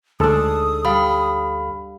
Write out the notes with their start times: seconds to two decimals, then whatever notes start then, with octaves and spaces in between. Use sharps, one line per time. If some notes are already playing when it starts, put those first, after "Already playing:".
0.20 D2 G#2 D4 A4 D#6 E6
0.85 G3 F5 B5